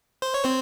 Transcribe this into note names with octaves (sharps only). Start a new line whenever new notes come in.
C5
C#5
C4 C5